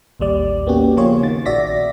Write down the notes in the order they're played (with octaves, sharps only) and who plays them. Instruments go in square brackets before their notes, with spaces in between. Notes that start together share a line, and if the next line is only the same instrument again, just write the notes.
[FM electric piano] A1 D#2 G3 D5
A#3 B3 C#4 F#4 G4
C#3 F3 A#3 F4 G#4 C#5
D#3 A6
A#1 F#4 D5 E5 A#6 B6